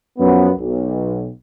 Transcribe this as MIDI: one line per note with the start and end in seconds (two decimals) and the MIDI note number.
0.19 0.50 42
0.19 0.50 53
0.19 0.50 59
0.59 1.30 35